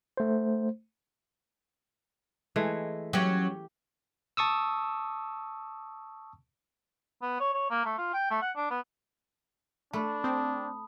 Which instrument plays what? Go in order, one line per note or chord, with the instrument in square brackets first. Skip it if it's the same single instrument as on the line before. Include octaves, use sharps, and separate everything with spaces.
[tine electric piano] A3 C5
[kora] E3 G#3 A3
[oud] F#3 C#4 [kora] G4
[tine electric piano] A5 C#6 D#6 E6
[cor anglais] B3
C#5
C#5
A#3
A3
F4
G5
A3
F#5
D4
B3
[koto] A3 [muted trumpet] D4 [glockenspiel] A5 B5
[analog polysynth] C4 [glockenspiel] D#6